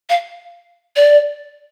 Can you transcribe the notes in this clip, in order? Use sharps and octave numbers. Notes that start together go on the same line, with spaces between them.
F5
D5